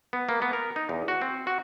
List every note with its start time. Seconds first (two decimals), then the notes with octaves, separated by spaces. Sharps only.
0.13 B3
0.29 A#3
0.42 B3
0.53 A#4
0.76 D#4
0.89 E2
1.08 F#4
1.22 C4
1.47 F#4